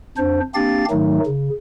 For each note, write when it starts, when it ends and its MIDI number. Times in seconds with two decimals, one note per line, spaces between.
0.17 0.40 41
0.17 0.40 62
0.17 0.40 72
0.55 0.85 58
0.55 0.85 60
0.55 0.85 62
0.55 0.85 67
0.55 0.85 77
0.55 0.85 93
0.90 1.19 44
0.90 1.19 51
0.90 1.19 54
0.90 1.19 57
0.90 1.19 63
1.26 1.49 49